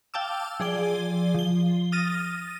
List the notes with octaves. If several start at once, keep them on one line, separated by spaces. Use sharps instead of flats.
F5 G5 A5 D6 E6
F3 G#4 D5 G7
F3 G7
D#6 F6 A6 A#6 D#7